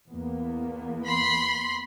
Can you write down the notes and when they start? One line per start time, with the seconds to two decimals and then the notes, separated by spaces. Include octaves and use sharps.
0.11 E2 A#3 B3
1.06 B5 C6